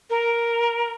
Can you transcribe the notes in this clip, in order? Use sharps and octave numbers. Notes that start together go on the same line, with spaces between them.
A#4